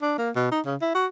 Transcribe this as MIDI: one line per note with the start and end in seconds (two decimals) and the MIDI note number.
0.02 0.16 62
0.18 0.30 58
0.35 0.50 47
0.51 0.60 63
0.65 0.75 49
0.81 0.93 64
0.94 1.07 66